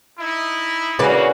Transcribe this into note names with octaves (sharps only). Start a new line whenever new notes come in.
D#4 E4
E2 C#3 A#3 F#4 B4 D5